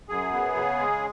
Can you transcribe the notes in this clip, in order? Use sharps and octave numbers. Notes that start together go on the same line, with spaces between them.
F#2 G#4
B3
C#3
G#3